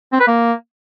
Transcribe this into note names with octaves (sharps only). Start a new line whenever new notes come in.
C4
B4
A#3